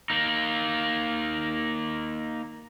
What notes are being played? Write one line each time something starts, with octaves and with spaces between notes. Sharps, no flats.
A#3 D#4